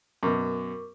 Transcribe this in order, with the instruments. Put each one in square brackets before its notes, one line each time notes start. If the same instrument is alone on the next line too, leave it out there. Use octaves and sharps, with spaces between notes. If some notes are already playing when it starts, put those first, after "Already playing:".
[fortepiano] F#2 B2 [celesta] A#4 C#6 D6